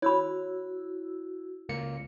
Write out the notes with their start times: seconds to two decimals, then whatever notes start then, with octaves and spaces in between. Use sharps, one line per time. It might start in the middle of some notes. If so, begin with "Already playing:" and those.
0.02 E4 F#4 C#5 B5 E6
1.69 C#2 A#3 C#7